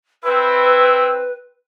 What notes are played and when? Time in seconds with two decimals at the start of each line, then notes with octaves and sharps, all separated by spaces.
0.23 C4 E4 B4